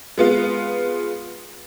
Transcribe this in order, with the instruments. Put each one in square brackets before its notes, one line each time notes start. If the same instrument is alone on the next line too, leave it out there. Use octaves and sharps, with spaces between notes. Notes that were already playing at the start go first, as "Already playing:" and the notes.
[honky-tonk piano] G#3 B3 F4